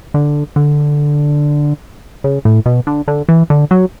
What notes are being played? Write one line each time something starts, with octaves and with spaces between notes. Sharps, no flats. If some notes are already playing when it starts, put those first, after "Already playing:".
D3
D3
C#3
A2
B2
D3
D3
E3
D3
F#3